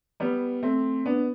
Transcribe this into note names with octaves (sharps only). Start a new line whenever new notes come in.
G3 B3
A3 C4
B3 D4